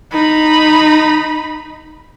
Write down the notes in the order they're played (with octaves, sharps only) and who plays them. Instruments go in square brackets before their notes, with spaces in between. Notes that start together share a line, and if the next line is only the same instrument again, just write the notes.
[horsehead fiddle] D#4 B5